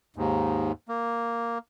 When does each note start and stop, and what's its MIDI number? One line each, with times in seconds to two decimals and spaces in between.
0.16 0.72 39
0.16 0.72 44
0.88 1.58 58